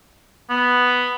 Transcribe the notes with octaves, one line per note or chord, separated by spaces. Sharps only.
B3